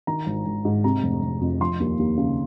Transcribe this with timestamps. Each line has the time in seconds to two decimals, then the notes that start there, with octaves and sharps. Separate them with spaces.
0.07 D#3 A#5
0.26 G#1
0.46 G#1
0.65 G#2
0.84 C3 A#5
1.02 F1
1.22 F1
1.41 F2
1.61 F3 C6
1.80 D#2
1.99 D#2
2.17 C#3